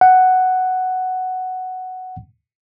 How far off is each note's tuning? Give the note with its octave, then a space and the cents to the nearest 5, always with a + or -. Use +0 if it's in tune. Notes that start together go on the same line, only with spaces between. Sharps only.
F#5 +5